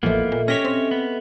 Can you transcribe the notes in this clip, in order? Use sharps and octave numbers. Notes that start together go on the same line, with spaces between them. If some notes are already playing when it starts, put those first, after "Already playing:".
A1 E2 F3 A#3 B3 A4 D#5 E5
A#2
C#4 G4 C#5 A#6 B6
C4
B3